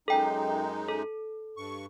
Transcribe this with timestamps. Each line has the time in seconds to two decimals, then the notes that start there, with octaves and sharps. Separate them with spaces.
0.08 F#2 G#3 D#4 A4 G5
0.88 A4
1.57 G2 C#6